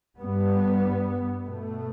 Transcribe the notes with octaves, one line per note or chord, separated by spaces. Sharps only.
G2 G3 B3
B2 A3